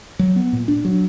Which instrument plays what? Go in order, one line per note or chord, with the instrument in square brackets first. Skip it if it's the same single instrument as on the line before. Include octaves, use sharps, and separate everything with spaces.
[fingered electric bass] F#3
B3
A#2
D4
F#3